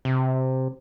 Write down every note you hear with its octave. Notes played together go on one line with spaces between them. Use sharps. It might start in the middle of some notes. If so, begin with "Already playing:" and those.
C3